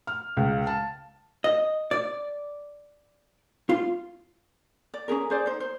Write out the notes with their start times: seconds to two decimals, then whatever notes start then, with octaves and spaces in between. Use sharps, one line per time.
0.07 F6
0.37 C#2
0.67 A5
1.44 D#5
1.91 D5
3.69 F4
4.94 D5
5.08 C#4 D#4 G#4 A#4
5.30 G#4 C5 D5
5.46 D#4 C5
5.60 C5